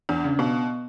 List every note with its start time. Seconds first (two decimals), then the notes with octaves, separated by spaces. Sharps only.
0.09 E2 D4
0.24 C#3
0.39 B2 B3